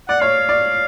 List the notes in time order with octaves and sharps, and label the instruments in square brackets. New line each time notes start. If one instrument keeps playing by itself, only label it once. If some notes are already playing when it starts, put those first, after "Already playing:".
[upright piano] D5 [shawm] F#5
[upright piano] C#5 [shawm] F5
[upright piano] D5